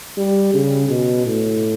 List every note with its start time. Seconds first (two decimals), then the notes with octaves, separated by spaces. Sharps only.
0.17 G3
0.54 C#3
0.89 B2
1.26 A2